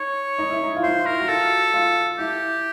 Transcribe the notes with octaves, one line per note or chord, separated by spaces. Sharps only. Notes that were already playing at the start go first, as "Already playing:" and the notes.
Already playing: D#4 C#5
D#4
E4
D#4
F4
E4 C5
A#4
F#4
F4 A4
F4
E4 G4